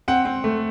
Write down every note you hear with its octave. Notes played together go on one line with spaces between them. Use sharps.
C4 F#5
C4
A3